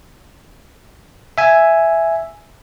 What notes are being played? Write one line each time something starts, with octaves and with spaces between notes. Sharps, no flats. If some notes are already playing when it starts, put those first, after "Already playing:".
E5 G#5